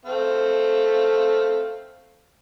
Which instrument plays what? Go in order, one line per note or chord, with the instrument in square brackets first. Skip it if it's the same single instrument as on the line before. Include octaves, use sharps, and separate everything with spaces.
[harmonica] A3 C4 F5